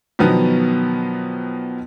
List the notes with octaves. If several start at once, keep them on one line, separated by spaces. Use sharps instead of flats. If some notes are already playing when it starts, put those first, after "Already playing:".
B2 D#3 F3 F#3 B3